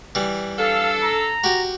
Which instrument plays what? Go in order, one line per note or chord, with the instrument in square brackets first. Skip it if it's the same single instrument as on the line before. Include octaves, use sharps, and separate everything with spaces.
[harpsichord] E3 G3
[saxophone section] D4 A4 [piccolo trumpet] F5
[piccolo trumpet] A#5
[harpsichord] F#4 G4